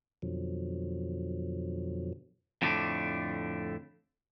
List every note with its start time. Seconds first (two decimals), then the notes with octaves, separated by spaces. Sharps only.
0.22 F2 B2 D3 F3 F#3
2.62 F2 A2 D3 G3 A3 D4